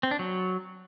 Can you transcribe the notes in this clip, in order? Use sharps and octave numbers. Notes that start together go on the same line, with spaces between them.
C4
D4
F#3